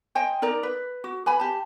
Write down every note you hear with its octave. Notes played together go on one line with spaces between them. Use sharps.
C5 D#5 G5 G#5
D#4 A#4 D5 A#5
B4
F#4
B4 G#5 B5
G4 A5